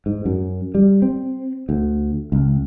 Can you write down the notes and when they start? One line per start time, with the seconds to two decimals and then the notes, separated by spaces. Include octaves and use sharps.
0.06 G#2
0.26 F#2
0.75 G3
1.02 C4
1.69 D2
2.32 C#2